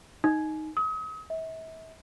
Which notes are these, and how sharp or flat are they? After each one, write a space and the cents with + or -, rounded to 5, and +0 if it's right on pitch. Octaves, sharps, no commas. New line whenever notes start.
D#4 +5
D#6 +40
E5 -35